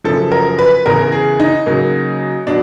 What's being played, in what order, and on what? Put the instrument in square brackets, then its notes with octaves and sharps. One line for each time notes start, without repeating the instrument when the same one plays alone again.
[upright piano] F#2 C#3 F3 A4
A#4
B4
E2 C#3 E3 A#4
G#4
D#4
C#3 F#3 A#3
B2 F#3 D4